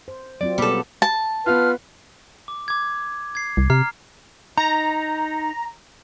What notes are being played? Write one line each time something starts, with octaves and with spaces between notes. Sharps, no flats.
C5
F#3 C4 F4 D5
B2 G3 A#3 B3 A4
A5
B3 F4 B4 F6
D6
D6 G#6
G#6 C7
C2
C3 A#5 F6 C7
D#4 A#5